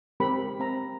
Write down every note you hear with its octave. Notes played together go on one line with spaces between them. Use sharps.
G#3 C4 G4 A#4 B5
C4 A#5